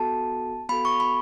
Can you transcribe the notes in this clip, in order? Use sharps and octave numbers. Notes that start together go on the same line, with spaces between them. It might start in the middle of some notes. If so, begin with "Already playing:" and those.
Already playing: B3 F#4 A4 A5
B3 F#4 A4 B5
C#6
B5